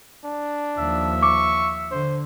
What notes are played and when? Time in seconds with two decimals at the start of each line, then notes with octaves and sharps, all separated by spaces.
0.25 D4
0.78 D#2 F3 E5
1.23 C#6 D6
1.91 D3 C5